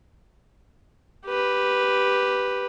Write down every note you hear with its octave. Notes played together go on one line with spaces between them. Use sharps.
G4 B4